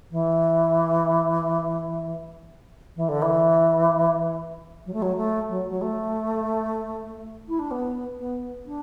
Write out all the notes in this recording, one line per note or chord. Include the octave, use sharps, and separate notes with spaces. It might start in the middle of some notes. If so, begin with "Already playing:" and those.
E3
E3
D3
E3
F#3
A3
F#3
A3
F#3
F#3
A3
E4
D4
B3
B3
D4